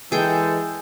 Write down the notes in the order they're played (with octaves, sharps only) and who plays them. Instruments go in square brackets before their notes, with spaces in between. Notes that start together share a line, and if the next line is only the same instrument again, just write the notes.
[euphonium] E3 [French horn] G#3 [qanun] G#4 G5 [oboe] A4